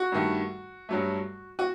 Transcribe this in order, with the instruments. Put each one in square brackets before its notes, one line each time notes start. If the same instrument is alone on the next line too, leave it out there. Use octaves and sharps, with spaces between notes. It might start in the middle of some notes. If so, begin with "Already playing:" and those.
Already playing: [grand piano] F#4
G2 D#3 A3
G2 F#3 A3
F#4